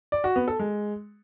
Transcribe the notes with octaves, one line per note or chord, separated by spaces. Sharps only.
D5
F#4
B3
A4
G#3